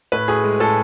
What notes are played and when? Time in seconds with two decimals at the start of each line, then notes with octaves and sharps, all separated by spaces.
0.12 A2 B4
0.28 A2 G#4
0.44 G#3
0.60 A2 A4